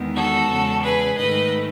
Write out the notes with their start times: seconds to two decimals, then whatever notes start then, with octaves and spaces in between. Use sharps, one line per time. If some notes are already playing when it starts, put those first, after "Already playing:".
Already playing: E2 D#3 G#3 B3
0.15 F#4 A4
0.49 E2 C#3 G#3
0.83 G#4 B4
1.17 G#2 D#3 A3 B4 D#5